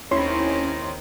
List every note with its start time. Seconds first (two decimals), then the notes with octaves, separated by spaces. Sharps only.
0.11 D#2 D#3 C4 C#4 E4 C#5 C6